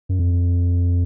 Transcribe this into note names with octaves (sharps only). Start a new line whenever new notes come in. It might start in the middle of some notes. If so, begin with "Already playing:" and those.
F#2
F2